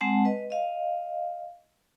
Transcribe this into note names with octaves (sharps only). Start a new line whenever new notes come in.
G#3 C4 F#5 A5
B4 D#5
D#5 F5